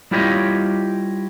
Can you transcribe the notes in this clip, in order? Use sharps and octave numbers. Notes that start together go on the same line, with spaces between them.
G3 E4 F4 G4 C#5 D#5